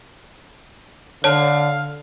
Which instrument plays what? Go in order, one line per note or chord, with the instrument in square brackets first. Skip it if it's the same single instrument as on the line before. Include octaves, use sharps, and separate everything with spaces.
[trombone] D3 [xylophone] C#5 A5 [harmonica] F5